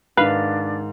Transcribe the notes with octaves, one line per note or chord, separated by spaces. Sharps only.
G#2 D#3 D4 B4 F5